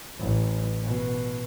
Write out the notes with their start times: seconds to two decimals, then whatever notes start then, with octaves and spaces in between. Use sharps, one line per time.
0.19 A1
0.84 B2